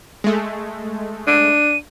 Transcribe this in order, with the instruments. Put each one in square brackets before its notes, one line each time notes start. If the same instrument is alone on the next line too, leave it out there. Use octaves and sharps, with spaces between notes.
[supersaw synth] G#3 A3
[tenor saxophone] D4 [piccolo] D#7